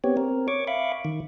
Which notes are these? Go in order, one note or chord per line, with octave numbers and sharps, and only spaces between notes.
B3 C4 G4 C#5
C4 A#4
C#5 C#6 D6
E5 F5 B5 C#6 D6
D#3